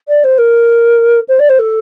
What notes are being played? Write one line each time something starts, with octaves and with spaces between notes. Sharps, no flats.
D5
C5
A#4
C5
D5
C5
A4